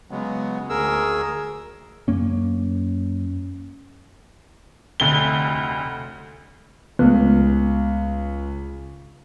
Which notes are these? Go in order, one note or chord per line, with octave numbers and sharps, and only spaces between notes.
C#3 F#3 G#3 B3
D2 G#4 A#4 E6
F#2 A#3 C#4
F1 D2 G7
C#2 A3 B3